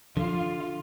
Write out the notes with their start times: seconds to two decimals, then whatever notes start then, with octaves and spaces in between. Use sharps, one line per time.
0.17 D3 F3 F4